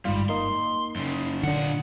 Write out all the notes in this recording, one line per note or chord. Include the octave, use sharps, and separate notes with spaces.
G1 G#2 G3 F4
A#3 D#4 C6
F#2 C#3
A#2 D3 D4 F#5